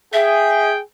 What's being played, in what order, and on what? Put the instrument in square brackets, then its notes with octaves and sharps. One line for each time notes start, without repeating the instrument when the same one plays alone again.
[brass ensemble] G#4 G5 [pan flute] E5